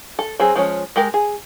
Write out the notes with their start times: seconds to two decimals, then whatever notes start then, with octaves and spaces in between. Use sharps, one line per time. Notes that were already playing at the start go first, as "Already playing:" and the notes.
0.19 A4
0.39 F#3 C4 G#4
0.55 F3 G#3 C#4 C#5
0.96 G#3 G4 A#4
1.14 G#4